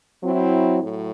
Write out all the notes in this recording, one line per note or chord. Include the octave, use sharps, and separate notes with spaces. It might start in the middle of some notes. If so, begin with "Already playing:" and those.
F#3 C4 E4
A2 F#3